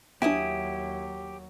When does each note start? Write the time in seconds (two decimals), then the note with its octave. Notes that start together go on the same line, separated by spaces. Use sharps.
0.22 D#2 F#3 B3 D4 E4 G4 G#5 D#6